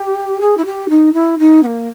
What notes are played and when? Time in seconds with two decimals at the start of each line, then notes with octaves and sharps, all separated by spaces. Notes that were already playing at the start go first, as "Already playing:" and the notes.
Already playing: G4
0.41 G#4
0.57 E4
0.65 G4
0.89 D#4
1.13 E4
1.39 D#4
1.63 B3
1.66 A#3